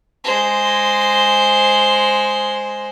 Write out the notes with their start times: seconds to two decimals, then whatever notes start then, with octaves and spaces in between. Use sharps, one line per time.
0.24 G#3 C5